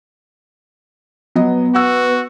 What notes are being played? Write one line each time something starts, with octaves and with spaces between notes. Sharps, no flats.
F#3 B3 D#5
F#4 F#5 E6